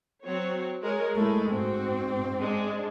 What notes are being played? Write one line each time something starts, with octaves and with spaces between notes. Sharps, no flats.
F#3 C4 C#5
G#3 A#4 C#5
G#3 A3 E4
G#2 C4 F#4
G#3 D4